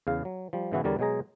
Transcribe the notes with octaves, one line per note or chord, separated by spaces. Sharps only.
E2 C#3 F5
F#3
F3 G3
G#2 C#3 E3 B3 E4 F#4
E2 D3 G3 A#4 C#5 D5
B2 F#3 G#3 G#4 A#5